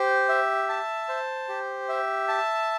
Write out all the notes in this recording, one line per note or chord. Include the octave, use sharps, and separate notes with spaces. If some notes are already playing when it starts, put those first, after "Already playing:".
Already playing: G4 C5
E5
A5
C5
G4
E5
A5